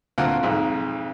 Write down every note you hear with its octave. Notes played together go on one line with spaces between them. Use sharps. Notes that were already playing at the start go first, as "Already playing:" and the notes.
D2 A#2 A#3 C4 F4 F#5
B1 F2 G#2